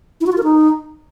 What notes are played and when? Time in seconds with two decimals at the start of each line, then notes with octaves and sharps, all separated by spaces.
0.21 E4
0.26 F#4
0.32 F4
0.38 A#4
0.43 D#4